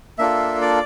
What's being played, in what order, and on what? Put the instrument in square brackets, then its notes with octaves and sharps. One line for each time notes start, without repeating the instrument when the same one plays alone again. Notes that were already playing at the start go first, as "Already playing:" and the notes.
[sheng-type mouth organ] A#3 D4 F4 A4 E5
D5